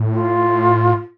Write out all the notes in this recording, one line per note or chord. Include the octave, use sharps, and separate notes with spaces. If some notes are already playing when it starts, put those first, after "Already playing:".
Already playing: A2
F4